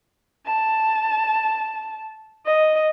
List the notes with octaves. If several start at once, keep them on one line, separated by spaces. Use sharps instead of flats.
A5
D#5